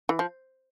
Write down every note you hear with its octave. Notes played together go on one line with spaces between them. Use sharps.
E3
F3